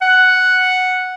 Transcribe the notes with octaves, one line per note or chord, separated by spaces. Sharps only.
F#5